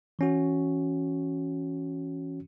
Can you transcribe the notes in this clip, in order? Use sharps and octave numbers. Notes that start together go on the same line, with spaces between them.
E3 C#4 F#4